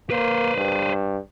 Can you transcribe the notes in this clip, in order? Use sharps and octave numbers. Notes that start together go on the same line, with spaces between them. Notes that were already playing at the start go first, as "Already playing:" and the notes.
A#3 B4 C5
G2